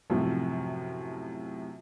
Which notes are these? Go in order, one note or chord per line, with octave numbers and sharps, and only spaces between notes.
F#2 A2 C3 F3